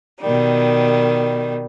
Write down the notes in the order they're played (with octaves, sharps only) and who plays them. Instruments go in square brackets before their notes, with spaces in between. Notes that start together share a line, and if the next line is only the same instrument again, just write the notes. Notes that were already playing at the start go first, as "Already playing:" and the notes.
[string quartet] B2 D#3 G3